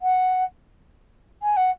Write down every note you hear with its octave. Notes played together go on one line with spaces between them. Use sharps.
F#5
G#5
F#5